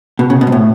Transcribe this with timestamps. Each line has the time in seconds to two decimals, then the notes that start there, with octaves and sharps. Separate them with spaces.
0.19 B2
0.30 C#3
0.41 B2
0.47 G#2
0.52 A2